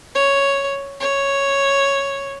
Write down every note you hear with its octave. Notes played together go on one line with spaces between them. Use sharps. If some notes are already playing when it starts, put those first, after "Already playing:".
C#5
C#5